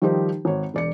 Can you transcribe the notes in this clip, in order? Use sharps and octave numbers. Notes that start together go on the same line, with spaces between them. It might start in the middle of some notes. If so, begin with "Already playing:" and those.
D#3 F3 G3 D#4 G4 C5
G#1 C#5
E1 D5 C#7